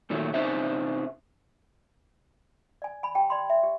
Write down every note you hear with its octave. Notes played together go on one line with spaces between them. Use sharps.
A#2 D#3 F#3 A3
C3 C#4 D#4 C5 E5
D5 G#5
G#5 B5
G4 G5 A5
D5 B5 C6
E5
G4